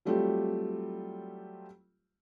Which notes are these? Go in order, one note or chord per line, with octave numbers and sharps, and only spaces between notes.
F#3 G3 A3 C4 F4 G4